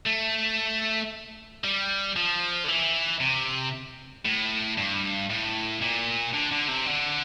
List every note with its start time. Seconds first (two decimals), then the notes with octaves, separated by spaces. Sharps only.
0.06 A3
1.64 G3
2.16 F3
2.64 D3
2.68 E3
3.21 C3
4.25 A2
4.78 G2
5.30 A2
5.81 A#2
6.33 D3
6.51 D3
6.68 C3
6.86 D3